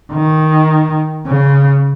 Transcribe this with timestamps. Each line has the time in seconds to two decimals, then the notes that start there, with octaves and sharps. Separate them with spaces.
0.13 D#3
1.27 C#3